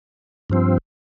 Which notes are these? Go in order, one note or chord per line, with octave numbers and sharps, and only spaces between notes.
G2 F3 C4